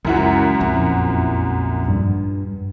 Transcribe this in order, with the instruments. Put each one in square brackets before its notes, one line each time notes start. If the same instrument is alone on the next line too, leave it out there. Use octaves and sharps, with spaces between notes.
[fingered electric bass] C#2 [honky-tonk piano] F#2 E4 F#4
[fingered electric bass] A#1 F2
[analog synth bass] G2